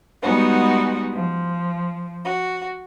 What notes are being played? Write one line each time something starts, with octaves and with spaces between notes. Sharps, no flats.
G3 G#3 B3 D#4 F#4
F3
F#4